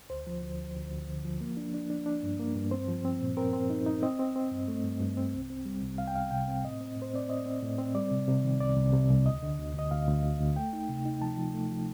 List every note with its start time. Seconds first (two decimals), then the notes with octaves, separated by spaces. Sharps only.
0.10 D2 C5
0.27 F3
0.43 D2
0.59 D2
0.76 D2
0.91 D2
1.08 D3
1.24 F3
1.41 A#3
1.57 D4
1.74 D4
1.90 D4
2.06 D4
2.23 G2
2.39 A#3
2.55 G2
2.71 C4 C5
2.88 F3
3.05 C4
3.21 A#2
3.37 C4 A#4
3.53 C4
3.70 D#4
3.86 D#4
4.03 C4 D#5
4.19 C4
4.36 C4
4.51 G2
4.68 A3
4.84 G2
5.01 G2
5.17 C4
5.33 C2
5.50 C4
5.66 G3
5.83 C2
5.98 C2 F5
6.07 G5
6.15 C2 F5
6.31 C3 G5
6.48 C4
6.64 A2 D#5
6.80 C4
6.97 A2
7.02 C5
7.13 C4 D5
7.29 C4 D#5
7.46 C4
7.62 A2
7.78 C4
7.95 G3 D5
8.11 C3
8.28 C3
8.43 D#3
8.60 C2 D5
8.76 C2
8.93 C3
9.10 C2
9.25 D2 D#5
9.43 D3
9.59 D2
9.74 D2 D#5
9.91 D2 F5
10.08 D2
10.23 D2
10.40 D2
10.56 A3 G5
10.73 D#4
10.89 C3
11.05 D#4
11.22 F3 A5
11.38 F3
11.54 A3
11.71 F3